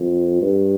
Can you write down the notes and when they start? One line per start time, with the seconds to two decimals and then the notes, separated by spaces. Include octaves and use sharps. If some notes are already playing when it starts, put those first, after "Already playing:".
Already playing: F2
0.41 G2